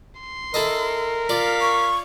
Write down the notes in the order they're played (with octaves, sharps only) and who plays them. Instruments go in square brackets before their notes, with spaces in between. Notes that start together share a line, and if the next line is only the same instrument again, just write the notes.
[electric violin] C6
[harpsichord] E4 A4 D#5 [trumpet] A#4
[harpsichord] F4 D5 [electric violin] F5 B6
[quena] C#6